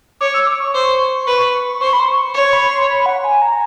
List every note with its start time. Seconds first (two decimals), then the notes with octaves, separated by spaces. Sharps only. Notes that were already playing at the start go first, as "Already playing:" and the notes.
0.21 C#5 D6
0.34 E6
0.47 D6
0.60 C#6
0.74 C5
1.27 B4
1.81 C5 C#6
1.93 B5
2.00 C6
2.08 C#6
2.34 C#5 C#6
2.53 B5
2.71 C6
2.89 B5
3.06 F#5
3.24 G#5
3.42 A#5